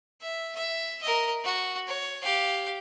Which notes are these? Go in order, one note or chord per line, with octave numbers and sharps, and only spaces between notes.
E5
E5
A#4 D#5
F#4
C#5
G4 F5